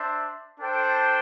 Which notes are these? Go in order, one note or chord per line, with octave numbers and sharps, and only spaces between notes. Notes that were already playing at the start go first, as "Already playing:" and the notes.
Already playing: D4 C5 E5
D4 A4 C5 G5